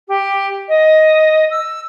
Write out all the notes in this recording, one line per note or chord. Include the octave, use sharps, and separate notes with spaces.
G4
D#5
E6